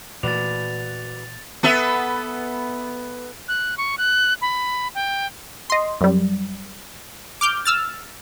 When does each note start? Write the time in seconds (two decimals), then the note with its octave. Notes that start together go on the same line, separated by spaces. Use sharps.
0.23 A#2 E3 A3 F#4 B4 D5 A6 F7
1.63 B3 A4 E5
3.48 F#6
3.77 C#6
3.98 F#6
4.42 B5
4.95 G5
5.70 D#5 C6
6.01 F#2 G3
7.41 D6 F6 G6
7.65 E6 F6 A6